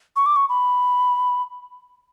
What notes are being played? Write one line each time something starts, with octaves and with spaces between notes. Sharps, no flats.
C#6
D6
C#6
B5